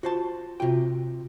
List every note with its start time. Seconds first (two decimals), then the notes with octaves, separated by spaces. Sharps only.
0.03 F4 F#4 C5 A5
0.60 C3 F4 F#4 G5